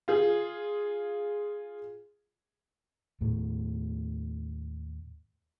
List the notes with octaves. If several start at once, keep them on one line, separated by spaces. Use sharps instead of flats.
F4 G#4
D#2 A2 A3